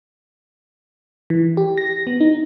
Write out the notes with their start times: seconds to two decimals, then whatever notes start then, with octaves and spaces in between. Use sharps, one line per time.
1.30 E3
1.57 G4
1.78 A#6
2.07 B3
2.21 D#4